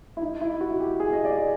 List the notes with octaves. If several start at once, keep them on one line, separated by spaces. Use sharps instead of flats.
E4
D#4
E4
F#4
G4
G#4
D#5
D5